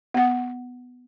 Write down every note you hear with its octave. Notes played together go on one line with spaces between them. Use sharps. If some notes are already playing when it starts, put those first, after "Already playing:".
B3 F#5